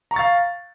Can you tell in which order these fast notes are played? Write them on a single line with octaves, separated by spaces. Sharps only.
A#5 C#6 A6 F5